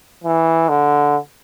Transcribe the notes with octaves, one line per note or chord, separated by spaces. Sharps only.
E3
D3